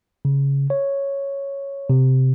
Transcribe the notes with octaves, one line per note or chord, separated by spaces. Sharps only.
C#3
C#5
C3